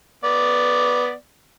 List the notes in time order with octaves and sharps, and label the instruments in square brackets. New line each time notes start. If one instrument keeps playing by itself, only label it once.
[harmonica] B3 D5